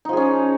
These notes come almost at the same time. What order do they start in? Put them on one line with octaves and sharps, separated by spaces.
D#4 F3 G#4 C#4